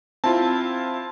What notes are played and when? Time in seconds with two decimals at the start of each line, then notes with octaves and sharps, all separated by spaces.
0.24 C4 E4 F4 A5